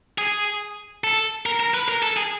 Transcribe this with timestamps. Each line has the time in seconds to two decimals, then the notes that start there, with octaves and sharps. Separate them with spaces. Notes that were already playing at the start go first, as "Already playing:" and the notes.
0.18 G#4
1.04 A4
1.46 A#4
1.60 A#4
1.74 B4
1.88 A#4
2.03 A4
2.17 G#4